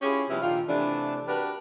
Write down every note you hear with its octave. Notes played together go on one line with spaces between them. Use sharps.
C#4 E4 F4 G4 G#4
C3 F3 G3 B3 C#4 E4
A#2 D#3 D4 F4
C3 E3 A3 D4
D4 F#4 G4 A#4 B4